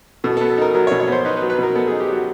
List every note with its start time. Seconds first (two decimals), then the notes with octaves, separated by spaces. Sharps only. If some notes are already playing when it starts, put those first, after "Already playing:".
0.24 B2 A4
0.37 A4
0.41 B3
0.50 A4
0.58 D#4 A#4
0.75 F#3 A#4
0.87 C#5
0.92 B2
1.00 C#5
1.08 B3 C5
1.25 D#4 B4
1.37 B4
1.42 F#3
1.50 B4
1.58 B2 A#4
1.75 B3 A4
1.87 D#4 G#4
2.00 G4
2.09 F#3 F#4